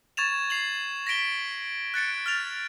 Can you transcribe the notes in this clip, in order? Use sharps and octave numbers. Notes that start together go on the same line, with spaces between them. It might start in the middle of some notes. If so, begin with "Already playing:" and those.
C#6 G#6 A6 E7 F7
C7 F7 F#7
A#6 B6 D7 G7
F#6 A6 C#7 D7
F6 A6 F7